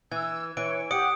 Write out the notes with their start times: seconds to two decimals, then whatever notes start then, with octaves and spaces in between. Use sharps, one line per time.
0.12 E3 E6 G#6
0.57 E3 C#5 D7
0.91 G4 F#5 D#6 C#7 D7